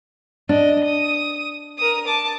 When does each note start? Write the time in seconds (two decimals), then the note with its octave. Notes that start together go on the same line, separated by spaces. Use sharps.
0.49 D4 D#5
0.84 D#6
1.78 A#4 D#6
2.07 A5 D6